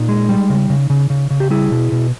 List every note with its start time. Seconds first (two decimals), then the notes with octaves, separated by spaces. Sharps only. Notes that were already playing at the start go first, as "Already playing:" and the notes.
Already playing: A#2 D#4
0.09 G#3
0.29 G3
0.49 C#3
0.70 C#3
0.90 C#3
1.10 C#3
1.30 C#3
1.40 G4
1.50 G3 E4 G#4
1.71 B2
1.92 B2